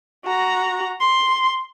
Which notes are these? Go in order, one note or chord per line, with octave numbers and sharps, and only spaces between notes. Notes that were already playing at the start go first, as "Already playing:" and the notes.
F#4 A#5
C6